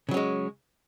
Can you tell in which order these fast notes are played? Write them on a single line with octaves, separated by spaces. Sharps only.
C#3 F#3 C#4 G#3